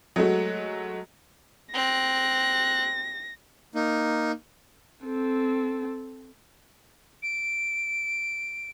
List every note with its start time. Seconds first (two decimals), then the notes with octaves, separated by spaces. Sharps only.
0.16 F#3 G#3 A3 F#4
1.74 C4 F#6 A#6
3.75 A#3 D#4
5.06 C4 A4
7.23 D7